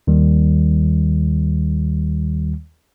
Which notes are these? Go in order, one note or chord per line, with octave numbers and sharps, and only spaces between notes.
D#2 D#3 G3